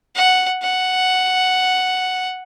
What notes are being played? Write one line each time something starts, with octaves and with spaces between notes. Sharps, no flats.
F#5
F#5